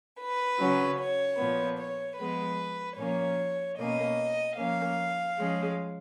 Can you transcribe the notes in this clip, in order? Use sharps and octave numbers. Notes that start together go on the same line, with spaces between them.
B4
C#3 F#3 C#4
C#5
A#2 F3 B3
C#5
F3 G#3 B3 B4
A#2 F3 A#3 C#4 C#5
B2 A#3 C#4 D#5
F3 A#3 C#4 F5
F3 G#3 C#4